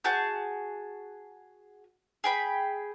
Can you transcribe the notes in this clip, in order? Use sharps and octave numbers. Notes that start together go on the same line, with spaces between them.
F#4 G#4 A5 G6
G#4 G5 B5